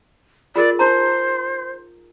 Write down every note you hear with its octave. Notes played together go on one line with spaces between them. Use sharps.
F4 G#4 A#4 D5
D#4 C5 A#5